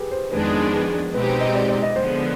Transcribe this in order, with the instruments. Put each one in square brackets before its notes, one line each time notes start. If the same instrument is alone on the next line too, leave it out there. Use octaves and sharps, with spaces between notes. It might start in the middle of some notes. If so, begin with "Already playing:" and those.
Already playing: [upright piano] G4 G#4 B4
C5
[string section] F2 D#3 G#3 B3 D4 [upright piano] B4
[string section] B2 G#3 C4 D#4 G4 [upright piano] B4
[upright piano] C5
D#5
D5
D5
D#5
[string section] D3 F3 G#3 B3 [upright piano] C5